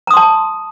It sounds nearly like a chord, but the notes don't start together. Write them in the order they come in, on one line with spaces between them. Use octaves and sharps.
A#5 D#6 C6 A5